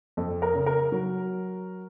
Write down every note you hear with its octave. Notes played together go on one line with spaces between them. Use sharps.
F2 A4
A#4
C#3
A#4
F#3